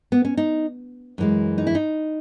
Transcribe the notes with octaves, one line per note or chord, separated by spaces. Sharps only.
B3
C#4
D#4
F#2 E3 G#3
D#4
E4
D#4